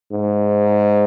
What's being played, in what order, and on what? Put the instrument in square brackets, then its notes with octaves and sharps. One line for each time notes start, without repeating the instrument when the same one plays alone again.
[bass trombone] G#2